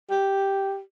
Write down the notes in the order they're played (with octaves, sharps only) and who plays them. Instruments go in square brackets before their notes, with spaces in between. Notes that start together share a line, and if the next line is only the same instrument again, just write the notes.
[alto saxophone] G4